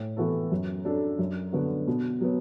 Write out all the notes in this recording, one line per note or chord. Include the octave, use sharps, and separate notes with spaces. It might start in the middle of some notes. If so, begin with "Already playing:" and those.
Already playing: A2
E3 B3 F#4 A4
F#2
F#3 D4 A4
F#2
D3 B3 F#4
B2
F#3 B3